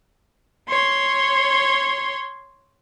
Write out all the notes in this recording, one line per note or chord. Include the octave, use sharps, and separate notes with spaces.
C#5 C6